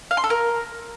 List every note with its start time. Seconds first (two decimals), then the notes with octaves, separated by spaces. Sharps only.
0.11 F5
0.17 C6
0.24 A4
0.30 A#4